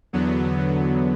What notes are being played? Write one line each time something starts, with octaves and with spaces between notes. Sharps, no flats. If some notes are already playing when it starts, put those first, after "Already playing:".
E2 D3 F#3 B3